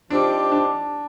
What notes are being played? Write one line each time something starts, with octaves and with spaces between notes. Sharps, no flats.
F3 C4 D4 D#4 G4
D4